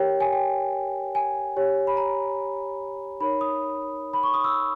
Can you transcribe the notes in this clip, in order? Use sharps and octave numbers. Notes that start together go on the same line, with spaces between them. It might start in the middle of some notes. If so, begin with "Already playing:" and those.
Already playing: G4 A#4 C#5 G5
G#5
G5
G#5
G4 C#5
B5
A#5
D#4 A#4 C#5 B5
D#6
B5
C#6
D#6
E6